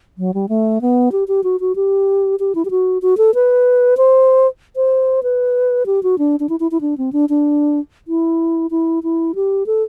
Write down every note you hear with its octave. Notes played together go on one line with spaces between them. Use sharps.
F#3
G3
A3
B3
G4
G4
F#4
F#4
G4
G4
E4
G4
F#4
F#4
A4
B4
C5
C5
B4
G4
F#4
D4
D4
E4
E4
E4
D4
C4
D4
D4
E4
E4
E4
G4
A4